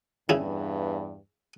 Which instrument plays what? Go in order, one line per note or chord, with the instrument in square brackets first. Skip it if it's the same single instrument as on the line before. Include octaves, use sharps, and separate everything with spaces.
[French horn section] E2 G2 [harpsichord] C#3 E4